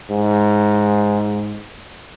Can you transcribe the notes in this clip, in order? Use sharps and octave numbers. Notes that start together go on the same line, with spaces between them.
G#2